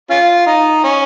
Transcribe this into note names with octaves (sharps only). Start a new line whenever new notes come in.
C#4 F4
D#4
C#4